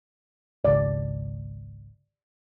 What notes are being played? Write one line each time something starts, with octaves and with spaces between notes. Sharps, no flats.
G#1 C#2 D5